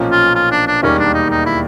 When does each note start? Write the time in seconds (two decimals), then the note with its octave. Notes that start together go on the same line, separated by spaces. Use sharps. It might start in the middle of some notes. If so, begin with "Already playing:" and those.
Already playing: B1 A#2 F3 A#3 C#4
0.11 F4
0.35 F4
0.51 D4
0.67 D4
0.83 E1 D#2 D#3 G3 A#3 C#4
0.99 D4
1.14 D#4
1.31 D#4
1.46 E4